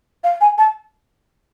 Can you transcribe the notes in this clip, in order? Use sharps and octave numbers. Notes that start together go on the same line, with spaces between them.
F5
G#5
A5